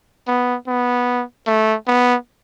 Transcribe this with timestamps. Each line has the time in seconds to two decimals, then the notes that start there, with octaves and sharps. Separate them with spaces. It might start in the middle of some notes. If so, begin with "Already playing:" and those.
0.28 B3
0.67 B3
1.47 A3
1.87 B3